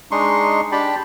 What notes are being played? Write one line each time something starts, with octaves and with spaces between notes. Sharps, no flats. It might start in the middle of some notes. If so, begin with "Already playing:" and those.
G#3 D4 D#4 C6 C#6
D4 G4 G5 A5 B5